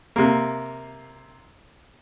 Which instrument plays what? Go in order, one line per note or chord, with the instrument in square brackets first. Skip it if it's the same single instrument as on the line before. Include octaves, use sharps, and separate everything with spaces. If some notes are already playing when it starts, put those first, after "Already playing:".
[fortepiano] C3 A#3